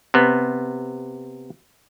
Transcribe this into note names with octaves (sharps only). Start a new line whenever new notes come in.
C3 B3